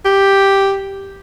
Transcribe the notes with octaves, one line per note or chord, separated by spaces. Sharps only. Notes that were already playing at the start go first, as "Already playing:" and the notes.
G4